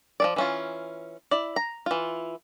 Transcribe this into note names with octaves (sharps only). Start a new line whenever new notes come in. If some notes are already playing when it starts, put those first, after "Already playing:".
F3 A3 D5
E3 C#4 F4
E4 D5
A#5
E3 F4